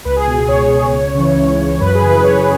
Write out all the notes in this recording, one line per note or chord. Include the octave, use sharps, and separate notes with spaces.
C#2 B4
G#4
B2 G#4
G#4
C#2 C#5
B2
C#2
C#3 E3
C#2
C#3 E3
F#2 B4
G#4
C#3
E3 B4
F#2 C#5